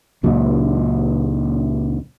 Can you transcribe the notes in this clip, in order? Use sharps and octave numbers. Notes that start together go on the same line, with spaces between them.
C#2 A#2 F#3